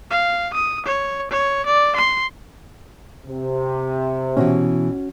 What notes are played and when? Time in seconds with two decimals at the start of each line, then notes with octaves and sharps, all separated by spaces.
0.11 F5
0.54 D#6
0.86 C#5
1.31 C#5
1.66 D5
1.96 C6
3.26 C3
4.37 B2 E3 C#4 F#4